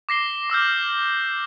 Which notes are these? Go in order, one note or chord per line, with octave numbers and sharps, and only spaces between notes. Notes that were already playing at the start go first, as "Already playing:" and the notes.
D6 A#6 C7 G7
D6 E6 F6 G6